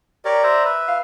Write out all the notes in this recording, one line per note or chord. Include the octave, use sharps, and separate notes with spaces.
G4 A#4 C#5 D5
C5 E5 A#5
B4 E5
F5